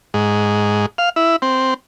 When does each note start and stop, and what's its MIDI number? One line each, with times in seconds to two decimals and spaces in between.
0.14 0.86 44
0.98 1.09 77
1.16 1.36 64
1.42 1.74 60